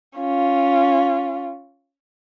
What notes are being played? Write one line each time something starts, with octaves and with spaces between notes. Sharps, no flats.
C#4 F4